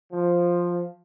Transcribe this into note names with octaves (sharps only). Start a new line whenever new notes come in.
F3